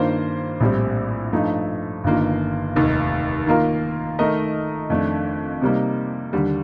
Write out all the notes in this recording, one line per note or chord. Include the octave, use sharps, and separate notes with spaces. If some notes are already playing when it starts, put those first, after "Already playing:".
Already playing: G2 D#3 A#3 F4 C5
A#1 A2 G3 C4
G2 F3 A3 D#4
G1 G2 D#3 A#3 F4
F1 D#2 D#3
D#3 A#3 F4 A#4
D#3 A3 D#4 A#4 D#5
F2 D#3 A3 D4
C3 G3 A#3 D#4
D#2 D3 G3